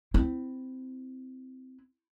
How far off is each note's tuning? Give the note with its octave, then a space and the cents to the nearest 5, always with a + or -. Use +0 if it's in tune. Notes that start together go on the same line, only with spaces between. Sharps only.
C4 -15 E4 +0